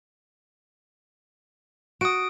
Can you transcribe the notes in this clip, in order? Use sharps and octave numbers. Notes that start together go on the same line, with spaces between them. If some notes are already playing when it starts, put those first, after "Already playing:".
F#4 D#6 D7